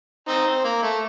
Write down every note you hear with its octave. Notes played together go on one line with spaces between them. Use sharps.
C4 D#4
C4
A#3
A3